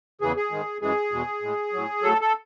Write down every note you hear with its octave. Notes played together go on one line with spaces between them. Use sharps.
E2 C#3 E3 G#4
G#4
G#2 D#3 G#3
F#2 E3 G#3 G#4
E2 B2 G#3
A2 G#3
A2 F#3
A2 F#3 A4
A4